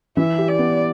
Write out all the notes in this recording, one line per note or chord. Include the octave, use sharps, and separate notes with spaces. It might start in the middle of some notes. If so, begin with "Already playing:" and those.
E3 E5
G4
D5
B3